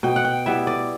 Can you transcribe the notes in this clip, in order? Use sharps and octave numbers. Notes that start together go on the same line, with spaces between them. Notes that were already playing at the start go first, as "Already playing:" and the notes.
B2 G5
F#5
G5
G3 B3 E4 E5
D5